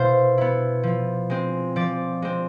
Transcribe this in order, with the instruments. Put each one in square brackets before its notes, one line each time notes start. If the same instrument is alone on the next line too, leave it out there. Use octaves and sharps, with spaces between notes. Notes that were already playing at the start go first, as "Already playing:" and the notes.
Already playing: [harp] B2 E4 C5 F5
B3 E4
F3
G#3 C4
F3 D5
G#3 C4